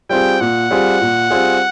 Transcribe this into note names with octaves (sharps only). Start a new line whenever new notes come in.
G3 C4 F4 G#4 G5
A#2 F#5
G3 C4 F4 G#4
A#2
G3 C4 F4 G#4